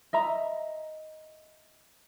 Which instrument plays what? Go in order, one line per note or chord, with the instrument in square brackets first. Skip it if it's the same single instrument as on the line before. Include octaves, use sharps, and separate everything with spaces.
[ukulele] D#5 E5 A#5